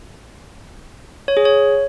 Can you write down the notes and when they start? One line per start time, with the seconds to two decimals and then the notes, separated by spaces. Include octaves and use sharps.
1.28 C#5
1.37 G#4
1.45 C#5